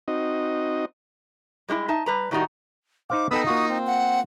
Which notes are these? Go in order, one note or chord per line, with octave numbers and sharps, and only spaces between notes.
C4 D#4 F#4 D#5
G3 G#3 C#4 E4
D#4 E5 A5
G3 B4 A#5
A2 D#3 G3 C4 D#4 F#4
D#4 C5 F5 D6
B3 D#4 A4 G5 B5 D#6 E6
A#3 F4 F#4 D#6
C4
F#5